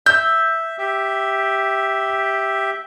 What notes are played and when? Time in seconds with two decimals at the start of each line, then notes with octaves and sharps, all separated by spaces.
0.06 E5 E6 G6
0.78 G4 E5